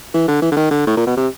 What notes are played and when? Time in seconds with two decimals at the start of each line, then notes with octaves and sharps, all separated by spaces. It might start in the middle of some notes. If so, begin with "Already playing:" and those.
0.14 E3
0.28 D3
0.42 E3
0.52 D3
0.57 D#3
0.71 D3
0.87 A2
0.97 A#2
1.07 B2
1.17 C3